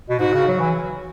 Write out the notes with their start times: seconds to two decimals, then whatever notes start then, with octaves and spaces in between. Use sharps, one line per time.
0.09 B2
0.19 G#2 F#4
0.33 C#3
0.48 F#3
0.59 E3